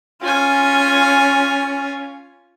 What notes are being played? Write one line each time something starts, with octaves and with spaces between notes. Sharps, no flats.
C#4 F4 G#5